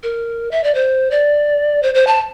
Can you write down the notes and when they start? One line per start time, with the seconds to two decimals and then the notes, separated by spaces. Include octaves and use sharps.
0.03 A#4
0.51 E5
0.63 D5
0.74 C5
1.11 D5
1.83 C5
1.94 C5
2.07 A5